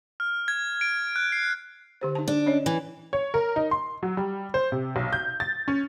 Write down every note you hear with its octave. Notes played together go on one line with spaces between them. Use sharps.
F6
G#6
D7
F#6
C7
D3 G4 C5
D#4 A5
D4
C#4 C#5 D#5
E3
C#5
A#4
D#4
C6
F#3
G3
C5
C3
B1
G6
A6
C#4